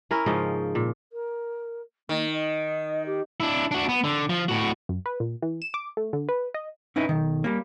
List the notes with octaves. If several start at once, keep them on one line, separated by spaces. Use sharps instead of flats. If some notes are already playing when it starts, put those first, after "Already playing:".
C#4 E4 A#4
G#2 C#3 F3 D#5
A#2
A#4
D#3 A#3
D#5
G4
D4 E4
D4 F#4
B3
D3
F3
A2 F#4
F#2
B4
A#2
E3
E7
D6
A3
D3
B4
D#5
C#4 D#4 E4 B4
B1 D#3
G3 A#3